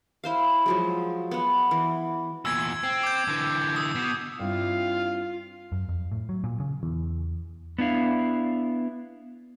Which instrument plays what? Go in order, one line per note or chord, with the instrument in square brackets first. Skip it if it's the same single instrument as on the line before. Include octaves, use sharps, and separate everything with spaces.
[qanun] E4 C5 F5
F3 F#3 G#3
B3 F#5
E3
[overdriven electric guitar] E2 A#2 [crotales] E6 G#6
[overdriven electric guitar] C4
[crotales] D6 G6
[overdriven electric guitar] D3 E3
[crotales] D#6
[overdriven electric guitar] B2
[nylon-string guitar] G2 C4 E4 [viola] F4 [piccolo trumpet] F5
[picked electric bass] F#2
F2
A2
F#3
A#2
C#3
[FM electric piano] E2
[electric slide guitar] B3 D4 E4 F5